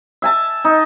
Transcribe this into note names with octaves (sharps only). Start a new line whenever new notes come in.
E5 G#5 A5
D#4